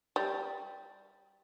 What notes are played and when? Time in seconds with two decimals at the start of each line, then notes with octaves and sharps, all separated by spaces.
0.16 G3